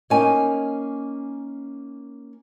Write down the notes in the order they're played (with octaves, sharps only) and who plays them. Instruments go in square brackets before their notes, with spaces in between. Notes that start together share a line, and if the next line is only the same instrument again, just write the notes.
[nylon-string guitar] A#3 C#4 D#4 G#5